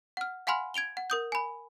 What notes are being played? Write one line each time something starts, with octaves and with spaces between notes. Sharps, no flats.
F#5 F6
F5 F#5 G#5 B5 C6 F6
G#6 D7 F7 G7
F#5
A#4 D#6 G6
G#5 B5